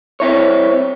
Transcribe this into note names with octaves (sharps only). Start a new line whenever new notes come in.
C4 E4 C#5